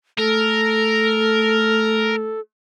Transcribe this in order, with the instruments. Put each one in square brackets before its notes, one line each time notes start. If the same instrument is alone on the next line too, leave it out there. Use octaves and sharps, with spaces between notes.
[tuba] A3 [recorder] A4 [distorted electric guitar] A#4